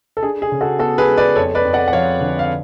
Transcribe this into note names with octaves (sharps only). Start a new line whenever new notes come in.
A4
D4 G#4
G#4
C#3
F#4 A4
B3 F#4 A4
G#4 B4
G#3
B4 D5
F2 A4 C#5
B4 D5
F2
D5 F#5
F#5
F3 C#5 F5
D3
F5